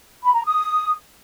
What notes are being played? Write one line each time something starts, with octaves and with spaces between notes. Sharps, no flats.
B5
A#5
D#6